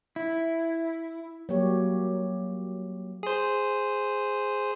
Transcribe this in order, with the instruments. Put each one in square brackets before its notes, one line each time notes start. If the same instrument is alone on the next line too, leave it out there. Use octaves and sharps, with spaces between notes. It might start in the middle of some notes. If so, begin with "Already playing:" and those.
[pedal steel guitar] E4
[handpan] F#3 G3 A#3 G4 C#5
[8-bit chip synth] G#4 C5